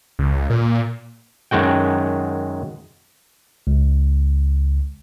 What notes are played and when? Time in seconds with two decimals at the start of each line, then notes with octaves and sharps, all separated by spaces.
0.19 C#2
0.50 A#2
1.51 F#2 D#3 G#3 F#4 G5
3.67 C#2